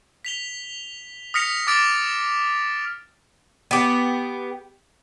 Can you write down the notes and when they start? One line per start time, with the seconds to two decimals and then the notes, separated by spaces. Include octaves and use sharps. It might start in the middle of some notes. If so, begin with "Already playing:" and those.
0.25 B6 F7 G7
1.34 D#6 F6 A#6 B6 C#7 F7
1.67 D6 D#6 F6 A6 D7
3.71 B3 G4